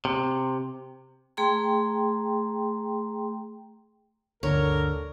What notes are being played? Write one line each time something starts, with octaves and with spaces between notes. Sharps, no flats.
C3
A3 G#4 G5 A#5 C6
G1 D2 D3 A#4 C#5